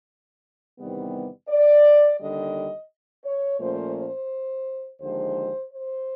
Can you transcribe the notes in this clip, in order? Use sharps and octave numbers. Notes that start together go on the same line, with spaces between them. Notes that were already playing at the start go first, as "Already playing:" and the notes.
E2 C3 D#3 G3 B3
D5
D#2 D3 G3 D#5
C#5
A#2 F3 A3 C#4 C5
C5
D#2 D3 F3 G#3 C5
C5